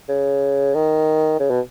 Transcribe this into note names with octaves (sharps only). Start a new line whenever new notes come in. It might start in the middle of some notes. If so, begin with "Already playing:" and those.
C#3
D#3
C#3
B2